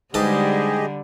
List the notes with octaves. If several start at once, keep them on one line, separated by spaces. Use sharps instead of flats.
G#2 D3 G3 G4 G#4 B4 D#5 A5